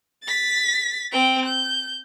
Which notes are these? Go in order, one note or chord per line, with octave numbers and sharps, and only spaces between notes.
A6 B6
C4 G5
G6